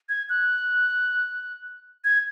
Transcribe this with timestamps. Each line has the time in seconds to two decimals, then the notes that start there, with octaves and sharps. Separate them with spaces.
0.09 G#6
0.29 F#6
2.05 G#6